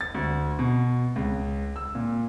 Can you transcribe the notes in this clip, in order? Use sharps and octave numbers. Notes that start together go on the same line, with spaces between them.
A6
D2
B2
C#2
E6
A#2